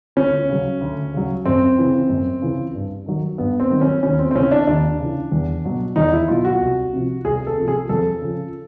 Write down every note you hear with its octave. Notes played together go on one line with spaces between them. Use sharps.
D2 C#4
C#3 F#3
D2
C#3 F#3
F#2 C4
C#3 E3
F#2
C#3 E3
G2
D#3 F#3
G2 B3
C4
D#3 F#3
C#4
D#2 C#4
C4
C4
C#3 E3 C#4
D4
D#2 D4
C#3 E3
E2
B2 F#3
E2 D#4
E4
B2 F#3 F4
F#4
C2
C3 F3
C2 G#4
A4
C3 F3
G#4
F2 A4
C#3 F3